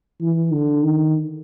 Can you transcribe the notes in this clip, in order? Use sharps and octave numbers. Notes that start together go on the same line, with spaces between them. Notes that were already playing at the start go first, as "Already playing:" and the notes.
E3
D3
D#3